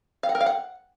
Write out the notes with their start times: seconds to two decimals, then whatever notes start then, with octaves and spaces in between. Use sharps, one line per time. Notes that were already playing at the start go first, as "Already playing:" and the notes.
0.23 F5
0.29 F#5
0.35 A#4
0.41 F5
0.46 F#5